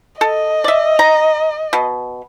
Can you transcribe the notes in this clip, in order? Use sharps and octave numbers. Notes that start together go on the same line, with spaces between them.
A4 D#5
D5 E5
A#5
B2